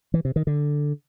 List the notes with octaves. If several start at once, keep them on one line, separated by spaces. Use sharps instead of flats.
E3
C3
D#3
D3